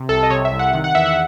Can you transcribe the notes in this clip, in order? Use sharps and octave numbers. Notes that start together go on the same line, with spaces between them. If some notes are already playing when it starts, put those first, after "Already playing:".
Already playing: C3
C2 A4
D#5
C3 C#5
E5
C2
F#5
D#3 F#5
F#5
E2 E5
F#5